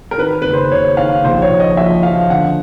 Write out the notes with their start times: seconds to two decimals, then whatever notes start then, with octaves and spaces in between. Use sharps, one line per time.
0.11 A#4
0.18 D#3 B4
0.42 F#1 B4
0.54 C5
0.71 F#1 C#5
0.97 D#3 F5
1.24 A#1 C5
1.42 C#5
1.51 A#1
1.60 D#5
1.77 F3 E5
2.03 F3 F5
2.30 D3 F#5